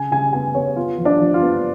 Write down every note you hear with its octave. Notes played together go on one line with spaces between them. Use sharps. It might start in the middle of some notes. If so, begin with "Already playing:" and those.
Already playing: C#3 G#5
C#3 G#5
B3 G#5
B3 C#5
B3 F4
F3
D4
F3
F4
B3